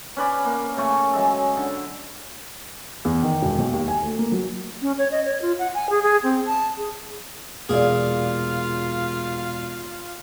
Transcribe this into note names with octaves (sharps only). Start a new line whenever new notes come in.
C#4 B4 D5
A#3
C#3 A3 C#6
F#3 G#3 A4
D3
E2
D#3
E1
B1
D#2
G#5
D2
A#3
F#3
C#4
C#5
D#5
C#5
F4
F#5
G#5
G#4
G#4
C4
A5
G#4
E1 A#2 F4 G#4 D5 F5